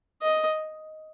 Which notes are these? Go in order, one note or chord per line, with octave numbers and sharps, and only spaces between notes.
D#5